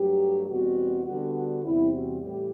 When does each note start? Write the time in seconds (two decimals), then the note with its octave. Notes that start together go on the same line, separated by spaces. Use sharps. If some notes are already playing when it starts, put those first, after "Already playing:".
Already playing: G2 F#3 A3 G4
0.49 E2 B2 G3 C4 F#4
1.05 D3 G3 B3 D4 F#4
1.35 F#4
1.64 E2 C3 G3 C4 E4
1.92 F#4
2.21 A2 E3 G3 G4